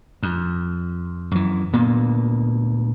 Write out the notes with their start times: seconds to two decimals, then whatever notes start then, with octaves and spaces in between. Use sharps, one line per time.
0.23 F2
1.32 F#2 E3
1.73 D2 A#2 A#3 B3